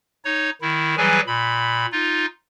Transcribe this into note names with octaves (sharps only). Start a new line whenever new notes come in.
D#4 C#5
D#3 E4
E3 F#3 G3 G#4 B4 G#5
A#2 B5
D#4 F4